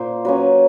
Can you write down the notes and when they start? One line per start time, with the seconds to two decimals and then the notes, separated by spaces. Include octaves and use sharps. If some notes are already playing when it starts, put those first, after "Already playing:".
Already playing: A#2 A#3 C5
0.25 F#3 A#3 C#4 B4